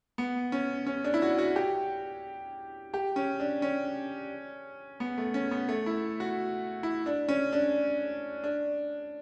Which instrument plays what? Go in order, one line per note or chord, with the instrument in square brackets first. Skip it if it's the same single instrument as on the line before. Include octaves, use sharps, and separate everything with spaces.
[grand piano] B3
C#4
C#4
D4
E4
F#4
F#4
G4
G4
C#4
D4
C#4
B3
A3
C#4
B3
A3
E4
F#4
E4
D4
C#4
D4
D4